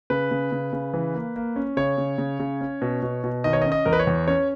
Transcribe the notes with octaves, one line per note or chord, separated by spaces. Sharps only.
C#3 B4
C#3
C#3
C#3
E3
A#3
A#3
C#4
C#3 C#5
C#3
C#3
C#3
C#4
B2
B2
B2
D#3 D#5
C#5
D#5
C#4
D#5
E2 A#4
B4
C#5
E2
C#4 C#5